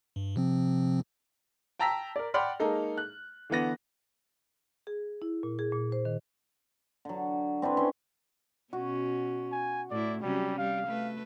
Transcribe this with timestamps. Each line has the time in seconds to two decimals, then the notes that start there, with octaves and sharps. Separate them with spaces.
0.16 G2
0.36 C3 F3 C4
1.79 G5 A5 A#5 E6 A#6 B6
2.16 A#4 D5
2.34 D5 F#5 G5 B5 C6 F6
2.60 G#3 A#3 D#4 A4
2.98 F#6
3.50 D3 E3 B3 A#6
4.87 G#4
5.22 E4
5.43 A#2
5.59 G#4
5.72 A#2
5.92 C5
6.05 D#3
7.05 D3 F#3
7.62 C4 D4 E4 B4
7.77 C#4 E5 A5 C6
8.73 B2 C#4 F#4
9.52 G#5
9.91 A2 E4 D5
10.22 C3 F#3 G3 C#4
10.58 G3 F5
10.87 A3 B4